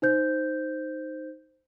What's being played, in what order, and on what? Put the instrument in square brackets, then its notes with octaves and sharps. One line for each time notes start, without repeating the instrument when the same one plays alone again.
[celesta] D#4 C5 G6